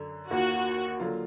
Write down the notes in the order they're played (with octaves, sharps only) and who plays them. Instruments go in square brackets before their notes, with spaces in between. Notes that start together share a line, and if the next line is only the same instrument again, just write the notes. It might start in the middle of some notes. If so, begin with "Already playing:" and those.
Already playing: [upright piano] F#2 D3
[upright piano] D#2 D#3 A#3 F4 [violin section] F#4
[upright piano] D3 F#3 A#3 F4